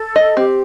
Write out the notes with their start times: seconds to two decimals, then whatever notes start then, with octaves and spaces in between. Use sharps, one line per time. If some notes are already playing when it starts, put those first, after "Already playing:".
Already playing: A4
0.16 D#5
0.37 C4 G4